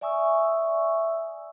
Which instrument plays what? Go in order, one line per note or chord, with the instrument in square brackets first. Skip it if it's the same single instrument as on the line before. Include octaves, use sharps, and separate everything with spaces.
[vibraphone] D5 E5 G#5 C#6 D#6 E6